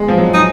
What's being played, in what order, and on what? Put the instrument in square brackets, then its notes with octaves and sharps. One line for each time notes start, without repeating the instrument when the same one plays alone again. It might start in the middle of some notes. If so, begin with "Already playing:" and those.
Already playing: [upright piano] G#3
F3
F#3
[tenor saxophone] D#4